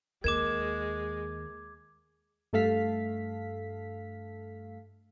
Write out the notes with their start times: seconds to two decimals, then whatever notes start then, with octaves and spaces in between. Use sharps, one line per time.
0.24 D#2 G#3 A#4 D6 G#6 E7
2.53 G2 A3 A4 F5 B6